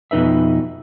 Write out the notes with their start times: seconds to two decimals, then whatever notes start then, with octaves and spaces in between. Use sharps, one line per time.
0.11 F2 B2 D#4 B4 E5